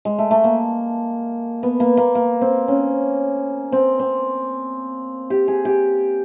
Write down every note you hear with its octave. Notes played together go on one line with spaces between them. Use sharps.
G#3
A3
A3
A#3
B3
A#3
A#3
A#3
C4
C#4
C4
C4
G4
G#4
G4